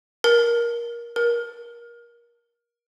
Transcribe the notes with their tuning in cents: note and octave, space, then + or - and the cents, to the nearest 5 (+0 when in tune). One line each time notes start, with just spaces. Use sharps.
A#4 +20
A#4 +25